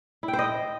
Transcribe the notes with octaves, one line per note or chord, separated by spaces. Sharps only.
E4
G5
C5
D#5